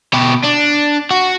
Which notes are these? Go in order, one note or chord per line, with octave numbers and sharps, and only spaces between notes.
B2 G4
D4
F#4